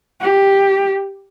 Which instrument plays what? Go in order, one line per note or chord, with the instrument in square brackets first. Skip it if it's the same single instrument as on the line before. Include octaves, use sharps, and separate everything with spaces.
[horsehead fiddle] G4